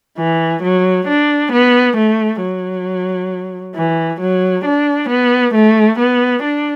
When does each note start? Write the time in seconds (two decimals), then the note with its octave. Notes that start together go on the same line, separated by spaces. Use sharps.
0.18 E3
0.63 F#3
1.07 D4
1.52 B3
1.97 A3
2.41 F#3
3.75 E3
4.20 F#3
4.65 D4
5.09 B3
5.54 A3
5.99 B3
6.43 D4